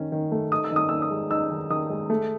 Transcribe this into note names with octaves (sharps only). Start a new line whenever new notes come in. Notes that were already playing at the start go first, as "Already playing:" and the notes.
Already playing: D#3 C#4
D#3
A3
D#4 D#6
E6
D#3 D#6
D#3 E6
D#6
G#3
D#4 E6
D#3
D#3 D#6
G#3
A3